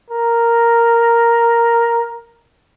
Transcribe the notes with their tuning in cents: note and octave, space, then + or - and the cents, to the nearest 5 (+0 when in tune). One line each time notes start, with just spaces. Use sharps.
A#4 +0